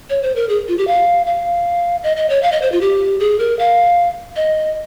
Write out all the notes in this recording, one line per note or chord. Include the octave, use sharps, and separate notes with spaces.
C#5
C5
A#4
G#4
F4
G4
F5
F5
D#5
D#5
C#5
F5
D#5
C5
F4
G4
G#4
A#4
F5
D#5